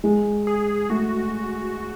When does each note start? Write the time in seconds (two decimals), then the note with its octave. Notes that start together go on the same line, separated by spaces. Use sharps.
0.04 G#3
0.47 G#4
0.90 A3 F#4